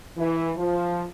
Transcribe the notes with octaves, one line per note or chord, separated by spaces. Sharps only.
E3
F3